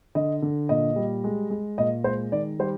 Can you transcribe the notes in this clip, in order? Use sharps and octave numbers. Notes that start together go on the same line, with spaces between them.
D3 D#5
D3
A#2 D#5
G3
G#3
G#3
A#2 D#5
G#3 C5
D#3 D5
G3 C5